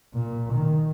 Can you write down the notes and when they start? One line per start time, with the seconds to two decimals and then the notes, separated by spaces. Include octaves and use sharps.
0.15 A#2
0.54 D#3